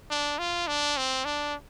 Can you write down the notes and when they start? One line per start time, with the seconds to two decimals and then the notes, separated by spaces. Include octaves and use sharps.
0.10 D4
0.39 F4
0.67 D4
0.97 C4
1.25 D4